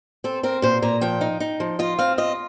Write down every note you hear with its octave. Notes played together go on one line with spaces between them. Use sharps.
C4 A4
C4 A#4
A#2 C5
A#2 A#5
F3 G5
D#4
D#4
F3
F4 D#5
C4 F5
F4 D#5